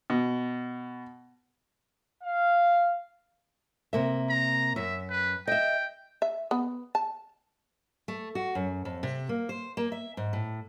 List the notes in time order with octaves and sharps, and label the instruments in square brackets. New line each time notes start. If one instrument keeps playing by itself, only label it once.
[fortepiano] B2
[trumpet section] F5
[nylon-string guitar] C3 A#3 E5
[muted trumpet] A#5
[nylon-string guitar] F#2 [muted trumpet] E5
[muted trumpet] B4
[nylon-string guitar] D#5 E5 [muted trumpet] G5
[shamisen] E5
B3
A5
[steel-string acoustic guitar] A3
F#4
F#2
F2
C3
A#3
C5
A#3
E5
G#2
A2